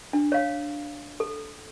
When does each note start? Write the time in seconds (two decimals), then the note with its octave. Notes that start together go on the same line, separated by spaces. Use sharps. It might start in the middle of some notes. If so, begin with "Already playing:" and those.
0.13 D4
0.32 C#5 F5
1.20 A4